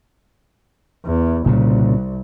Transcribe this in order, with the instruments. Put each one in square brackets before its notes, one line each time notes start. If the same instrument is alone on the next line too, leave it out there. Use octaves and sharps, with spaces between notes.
[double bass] E2
[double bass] C2 [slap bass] A#2 C#3